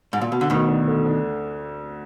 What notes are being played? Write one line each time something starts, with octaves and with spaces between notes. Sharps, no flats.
G#2
A#2
B2
D3
D2 B2 D#3
D4
D3
D4